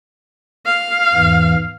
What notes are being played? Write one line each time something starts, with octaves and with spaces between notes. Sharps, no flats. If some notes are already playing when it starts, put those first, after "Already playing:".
F5
E2 G#2 E3